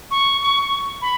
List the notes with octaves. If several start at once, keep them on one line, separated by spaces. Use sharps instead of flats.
C#6
C#6
B5